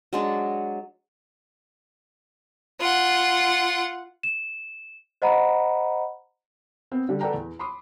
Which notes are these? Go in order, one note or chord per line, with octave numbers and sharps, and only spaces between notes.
F#3 G#3 D4
F4 F#5
E7
C5 D#5 F#5 A#5 B5
B3 C4
D3 G3
A4 B4 D5 F#5 G5 A#5
E2
B5 C6 D6 D#6